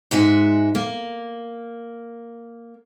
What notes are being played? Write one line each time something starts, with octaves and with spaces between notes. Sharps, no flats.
G#2 G#3 F#4 E5
A#3